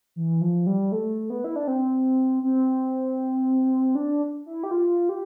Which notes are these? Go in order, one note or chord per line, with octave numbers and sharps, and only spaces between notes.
E3
F3
G3
A3
B3
E4
D4
C4
C4
D4
E4
G4
F4
G4